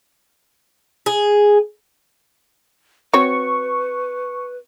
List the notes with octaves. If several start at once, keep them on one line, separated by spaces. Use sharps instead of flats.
G#4
C4 F#4 B4 C#5 C#6